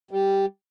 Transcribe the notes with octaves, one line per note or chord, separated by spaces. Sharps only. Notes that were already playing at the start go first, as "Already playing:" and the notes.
G3